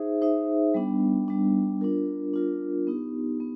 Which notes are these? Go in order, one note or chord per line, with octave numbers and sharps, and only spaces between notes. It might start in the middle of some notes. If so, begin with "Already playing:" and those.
Already playing: D#4 G#4 C5 E5
D#4 G#4 C5 E5
G3 B3 D4
G3 B3 D4
D4 F4 A#4
D4 F4 A#4
B3 D#4 G4
B3